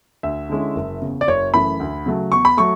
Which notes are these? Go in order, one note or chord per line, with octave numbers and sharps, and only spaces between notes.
D2 E5
D3 G#3 C#4 E4
F#1
E2 C#3
D5
F#1 C#5
F#2 E3 A3 B5
D2
C#3 F#3 A3
E2 C#6
B5
F#3 A3 C#6